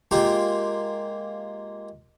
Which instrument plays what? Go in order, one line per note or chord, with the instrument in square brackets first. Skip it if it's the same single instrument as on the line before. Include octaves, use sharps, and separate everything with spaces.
[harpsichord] G#3 A#3 F4 G4